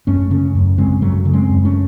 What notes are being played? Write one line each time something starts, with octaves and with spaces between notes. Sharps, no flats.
F#2 A3 C#4
C#3 A3 C#4
F#2
C#3 G#3 C4
F#2 F#3 A3
C#3
G#3 C4
F#2
A3 C#4